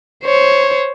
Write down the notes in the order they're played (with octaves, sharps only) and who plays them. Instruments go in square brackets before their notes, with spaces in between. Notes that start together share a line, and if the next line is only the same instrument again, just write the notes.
[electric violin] C5 C#5